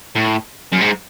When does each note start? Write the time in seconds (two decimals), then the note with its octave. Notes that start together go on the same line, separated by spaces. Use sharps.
0.16 A2
0.73 F#2
0.81 G#2